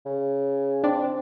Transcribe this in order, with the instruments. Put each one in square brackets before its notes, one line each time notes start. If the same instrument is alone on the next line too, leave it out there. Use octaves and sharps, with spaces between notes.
[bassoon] C#3
[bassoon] C4 [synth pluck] D4